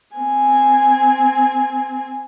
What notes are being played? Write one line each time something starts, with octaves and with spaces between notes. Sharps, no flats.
C4 G#5